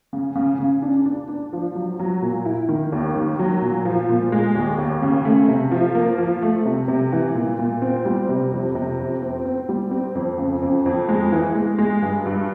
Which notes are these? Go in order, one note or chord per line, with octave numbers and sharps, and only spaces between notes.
C#3
C#3
C#3
D4
D4
D4
F3
F#3
F#3
A#2
E4
D#3
D#2
D#3
F#3
A#2
F3
A#2
G#3
D#2
D#2
C#3
A3
C3
F3
A#3
F3
A3
C3
C3
E3
A#2
A#2
C4
G3
C3
F2
C3
F2
C4
C4
G3
C4
F2
C#3
F2
F2
G#3
E3
G#3
G#3
G2
G2